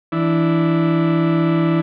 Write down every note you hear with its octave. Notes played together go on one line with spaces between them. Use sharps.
E3 D4 E4